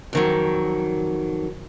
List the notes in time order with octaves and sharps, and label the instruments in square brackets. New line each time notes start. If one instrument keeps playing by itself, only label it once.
[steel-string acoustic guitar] F2 D#3 F#3